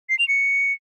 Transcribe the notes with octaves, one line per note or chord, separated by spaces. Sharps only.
C7
F7
C#7